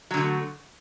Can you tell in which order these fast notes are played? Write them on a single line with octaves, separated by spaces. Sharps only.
F#3 D3 A3